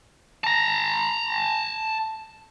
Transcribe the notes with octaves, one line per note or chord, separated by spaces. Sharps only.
A5 A#5